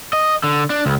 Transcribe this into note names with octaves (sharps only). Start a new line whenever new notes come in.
D#5
D3
D4
C#2